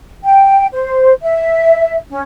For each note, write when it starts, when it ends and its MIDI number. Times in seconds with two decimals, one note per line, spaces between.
0.24 0.66 79
0.72 1.13 72
1.22 1.96 76
2.09 2.21 61